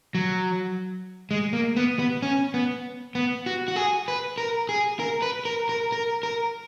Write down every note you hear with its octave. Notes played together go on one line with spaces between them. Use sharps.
F#3
G#3
A#3
B3
B3
C#4
B3
B3
F#4
F#4
G#4
B4
A#4
G#4
A#4
B4
A#4
A#4
A#4
A#4